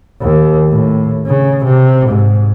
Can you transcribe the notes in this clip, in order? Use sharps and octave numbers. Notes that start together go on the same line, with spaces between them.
D#2
A2
C#3
C3
G#2